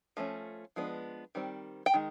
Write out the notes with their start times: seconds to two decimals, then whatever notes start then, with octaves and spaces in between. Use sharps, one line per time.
0.17 F3 A3 C#4
0.76 F3 G#3 B3 D4
1.35 D#3 G3 C4
1.86 G5
1.94 D#3 G#3